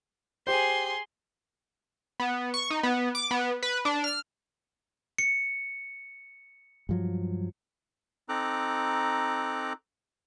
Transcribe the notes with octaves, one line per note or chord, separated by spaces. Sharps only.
G4 G#4 C5 C6
B3
C#6
D#4
B3
D6
B3
B4
D4
F6
C#7
G2 F3 F#3
C4 D#4 A4 A#5 D6 F#6